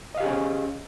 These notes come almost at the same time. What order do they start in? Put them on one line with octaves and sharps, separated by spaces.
D#5 F5 G4 G#4 C#4